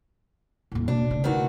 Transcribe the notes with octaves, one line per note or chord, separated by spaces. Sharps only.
D#1 A2
B2 A#3 D4
C#3 A3
D#3 E3 F#4